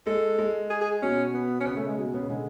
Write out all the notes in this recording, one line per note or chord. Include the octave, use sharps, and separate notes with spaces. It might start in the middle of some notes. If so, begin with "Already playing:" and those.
G#3 A4
G#3
G#4
G#4
B2 C#4
B3
C#4
C#3 B3
A3
G#3
B2 G#3
C#3 B3
D3 G#3